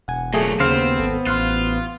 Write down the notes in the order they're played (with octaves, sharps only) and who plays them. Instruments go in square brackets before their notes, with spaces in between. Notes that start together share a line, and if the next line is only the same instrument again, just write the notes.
[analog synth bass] E1 [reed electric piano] F#5 G#5
[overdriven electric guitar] A#2 F#3 [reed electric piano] A3 G#4
[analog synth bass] D#2 [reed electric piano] C#3 [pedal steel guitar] B3 C5 F5 [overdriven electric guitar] C4
[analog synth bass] G#1 [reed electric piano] A4
[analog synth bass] A1 [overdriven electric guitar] F4 [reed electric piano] C6 F6 F#6